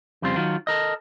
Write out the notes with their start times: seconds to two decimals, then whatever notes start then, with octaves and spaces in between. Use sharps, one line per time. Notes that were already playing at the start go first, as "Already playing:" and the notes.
0.22 F2 C#3 G3 C4 F4
0.36 D#3 F#3 F4
0.67 A4 A#4 D#5